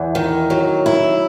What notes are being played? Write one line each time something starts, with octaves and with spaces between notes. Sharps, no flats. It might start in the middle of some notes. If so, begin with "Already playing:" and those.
Already playing: E2
D#3
F#3
E4